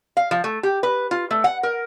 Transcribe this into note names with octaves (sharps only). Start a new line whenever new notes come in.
F5
F3
A3
G4
B4
F4
A3
F#5
A#4